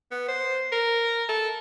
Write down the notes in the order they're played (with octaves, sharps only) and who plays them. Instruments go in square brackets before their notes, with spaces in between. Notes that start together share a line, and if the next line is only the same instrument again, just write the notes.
[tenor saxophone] B3
C5
A#4
A4